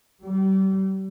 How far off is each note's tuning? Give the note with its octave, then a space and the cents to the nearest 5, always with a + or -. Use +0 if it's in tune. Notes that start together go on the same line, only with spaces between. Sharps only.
G3 -35